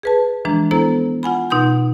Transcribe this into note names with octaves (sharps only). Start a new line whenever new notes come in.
G#4 B4 A5
E3 F3 G#3 D4 A#5
B3 E4 A4 C5 A#5
F4 F#5 G#5 B5
B2 D#4 F#5 C6 D#6 G6